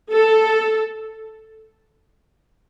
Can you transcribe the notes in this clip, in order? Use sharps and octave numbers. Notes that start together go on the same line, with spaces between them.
A4